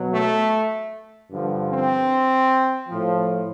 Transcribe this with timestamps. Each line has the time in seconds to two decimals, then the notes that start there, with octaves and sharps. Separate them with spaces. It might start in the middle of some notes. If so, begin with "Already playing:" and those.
Already playing: B2 F#3
0.13 A3
1.31 G2 D3 F3
1.70 C4
2.88 A2 F3